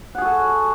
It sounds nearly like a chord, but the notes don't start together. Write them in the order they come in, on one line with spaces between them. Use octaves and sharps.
F#5 G#4 F#4 A4